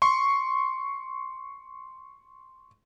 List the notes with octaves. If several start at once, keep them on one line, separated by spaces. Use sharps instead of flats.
C6 C#6